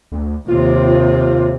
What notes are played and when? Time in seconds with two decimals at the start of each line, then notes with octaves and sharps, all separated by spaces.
0.12 D2
0.48 D#2 C3 F4